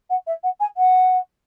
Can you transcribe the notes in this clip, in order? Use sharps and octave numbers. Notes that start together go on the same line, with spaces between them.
F#5
E5
F#5
G#5
F#5